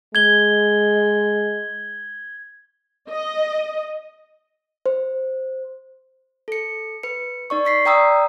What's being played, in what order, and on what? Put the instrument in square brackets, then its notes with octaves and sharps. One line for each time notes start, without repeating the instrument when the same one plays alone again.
[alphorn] G#3 [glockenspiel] G#6 G7
[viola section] D#5
[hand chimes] C5
A4 C#7
B4 C#7
D#4 D5 C#6
C#6 B6 C7
D5 G5 A#5 D#6 E6